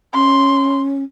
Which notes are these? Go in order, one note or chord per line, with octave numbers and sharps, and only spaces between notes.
C#4 C6